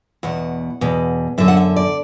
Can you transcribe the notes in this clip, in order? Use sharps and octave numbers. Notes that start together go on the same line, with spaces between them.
E2 B2 F#5
E2 B2
F#2 D3 E5
F#5
E5
D5